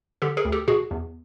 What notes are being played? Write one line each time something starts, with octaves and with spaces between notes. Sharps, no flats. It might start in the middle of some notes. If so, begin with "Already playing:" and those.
D3 G4 A4
G#4 A#4
D2
G4 A4
B2 F#4 G#4
E2